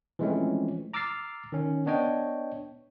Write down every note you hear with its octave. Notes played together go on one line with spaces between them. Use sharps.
E3 F3 G#3 A3 C4 C#4
A#5 D6 E6 F6 A6 C7
D#3 C#4
B3 D4 C#5 D#5 G5